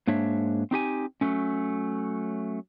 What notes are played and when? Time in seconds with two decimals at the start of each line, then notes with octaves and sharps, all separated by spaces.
0.07 G#2 A#3 D4 C#5 E5
0.71 C4 D#4 G4 G#5
1.21 F#3 A3 C#4